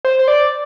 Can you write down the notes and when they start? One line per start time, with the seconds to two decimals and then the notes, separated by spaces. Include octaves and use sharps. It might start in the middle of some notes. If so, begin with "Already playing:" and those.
0.05 C5
0.19 C5
0.28 D5